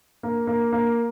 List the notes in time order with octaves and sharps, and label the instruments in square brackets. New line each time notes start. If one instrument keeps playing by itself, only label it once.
[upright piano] A#3
A#3
A#3